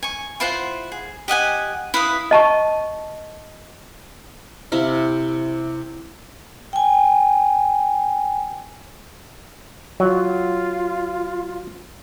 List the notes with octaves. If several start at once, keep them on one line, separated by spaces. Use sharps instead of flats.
G#5 C#6
E4 F4 C5 F#5
G#4
G4 D#5 F#5 G#5
E4 B4 F5 D#6
D#5 A5 C#6
C3 E4 F5
G5 G#5
F#3 F4